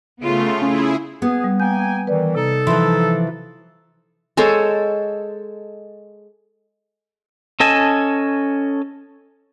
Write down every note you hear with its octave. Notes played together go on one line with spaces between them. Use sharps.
C#3 A3 B3 F4
C#4 E4 G#4
B3 G#4
G3
A#3 G5 G#5 G6
D#3 E3 B4 D5
C3 D#4 A4
E3 F3 E5 C6
G#3 A4 C5 C#5
C#4 A4 D#5 G#5 A5